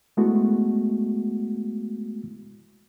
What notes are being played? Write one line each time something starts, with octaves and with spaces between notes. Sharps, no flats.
G#3 A3 B3 E4 F#4